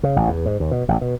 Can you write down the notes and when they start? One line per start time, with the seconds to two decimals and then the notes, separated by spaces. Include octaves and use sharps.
0.03 C#3
0.16 A1
0.28 E2
0.46 G#2
0.60 D#2
0.71 B2
0.88 A1
1.01 B2